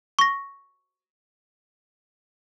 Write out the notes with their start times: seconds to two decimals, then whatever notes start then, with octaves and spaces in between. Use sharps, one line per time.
0.19 C#6 A#6